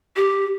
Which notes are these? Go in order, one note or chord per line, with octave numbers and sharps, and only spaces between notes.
G4